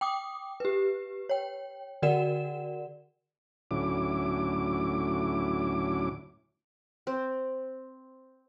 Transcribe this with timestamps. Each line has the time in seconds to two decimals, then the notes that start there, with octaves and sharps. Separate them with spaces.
0.01 G5 D6 D#6
0.60 G4 B4
1.29 C#5 G5
2.02 D3 F#4 A#4 D5 F#5 E7
3.71 D2 A2 F#3 C#4 E4 D6
7.07 C4